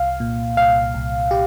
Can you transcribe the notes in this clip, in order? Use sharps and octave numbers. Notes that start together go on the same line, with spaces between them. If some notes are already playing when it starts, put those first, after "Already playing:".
Already playing: C2 F5
A#2
C2 F5
C2
G4